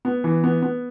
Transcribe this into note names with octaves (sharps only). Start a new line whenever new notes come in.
B3
E3
B3
B3